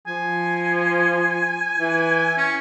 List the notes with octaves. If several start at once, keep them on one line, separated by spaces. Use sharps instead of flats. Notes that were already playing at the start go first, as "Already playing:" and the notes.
F3 G#5
E3
C#4